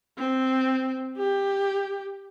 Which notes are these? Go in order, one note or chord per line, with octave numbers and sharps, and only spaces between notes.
C4
G4